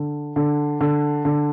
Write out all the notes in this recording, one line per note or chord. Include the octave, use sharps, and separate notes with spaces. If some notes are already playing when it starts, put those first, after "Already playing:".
Already playing: D3
D3
D3
D3